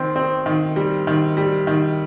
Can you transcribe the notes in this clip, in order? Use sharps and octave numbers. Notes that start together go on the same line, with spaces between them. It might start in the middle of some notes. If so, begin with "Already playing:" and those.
Already playing: D#3 C4
C4
D#3
G3
D#3
G3
D#3